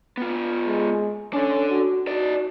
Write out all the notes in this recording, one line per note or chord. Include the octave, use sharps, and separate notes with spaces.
B3 F4
G#3
C#4 D4 A4
F#4
D#4 F#4 D5